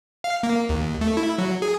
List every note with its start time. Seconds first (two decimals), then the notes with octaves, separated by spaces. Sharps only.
0.24 F5
0.43 A#3
0.69 D#2
1.01 A3
1.17 E4
1.38 F#3
1.62 G#4